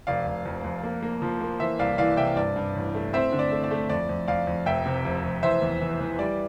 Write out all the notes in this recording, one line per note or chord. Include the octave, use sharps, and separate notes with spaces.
F1 D5 F5
F1
F2
F2
A#3
A#3
F3
A#3
E3 C5 E5
C2 D5 F5
E3 D5 F5
C3 E5 G5
G2 D5
G2
A1
A3
C4 C5 E5
D3
D5
A3
D5
A3
F2 D5
F2
F2 D5 F5
F2
F1 E5 G5
C3
F1
F1
E3 C5 E5
E2
E3
E3
G3 D5